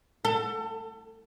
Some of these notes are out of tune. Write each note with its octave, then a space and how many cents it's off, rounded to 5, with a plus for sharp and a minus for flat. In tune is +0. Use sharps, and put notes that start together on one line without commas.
A4 +30